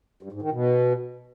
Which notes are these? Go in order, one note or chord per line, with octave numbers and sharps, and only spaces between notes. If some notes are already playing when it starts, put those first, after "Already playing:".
G2
G#2
D#3
B2